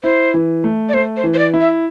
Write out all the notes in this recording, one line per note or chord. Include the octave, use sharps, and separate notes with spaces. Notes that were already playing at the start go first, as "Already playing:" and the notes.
E4 C5
E3
A3
D5
A3 C5
C5
E3
C5
D5
E4
E5